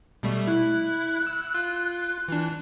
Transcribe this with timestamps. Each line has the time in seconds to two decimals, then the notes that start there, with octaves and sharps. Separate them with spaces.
0.23 B2 G3 A3
0.47 E4 F#6
1.27 E6
1.54 F4
2.28 E3 D4